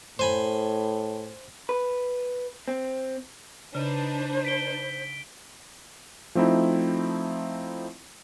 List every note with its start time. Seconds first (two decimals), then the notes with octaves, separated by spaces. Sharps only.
0.19 A2 C5 G#5 B5
1.69 B4
2.68 C4
3.75 C#3 D4 D#4 B4 C5
4.45 B6 D7 G7
6.35 F3 A3 C4 D#4 E4